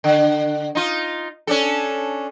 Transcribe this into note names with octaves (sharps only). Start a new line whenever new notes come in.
D3
D#4 F4
C#4 D4 A4